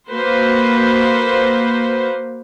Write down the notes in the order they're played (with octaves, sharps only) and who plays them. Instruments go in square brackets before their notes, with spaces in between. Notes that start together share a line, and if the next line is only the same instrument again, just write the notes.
[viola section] A#3 F#4 B4 C5